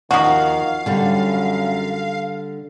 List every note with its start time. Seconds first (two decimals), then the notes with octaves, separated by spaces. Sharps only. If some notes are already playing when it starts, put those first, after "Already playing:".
0.11 D#2 D#3 F3 F#4 F5
0.86 F#2 D3 G3